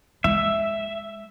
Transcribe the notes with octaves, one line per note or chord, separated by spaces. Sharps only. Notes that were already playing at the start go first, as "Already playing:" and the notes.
G#3 E5